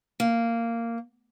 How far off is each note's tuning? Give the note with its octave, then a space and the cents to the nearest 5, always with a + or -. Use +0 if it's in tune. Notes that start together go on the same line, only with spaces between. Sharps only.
A#3 -10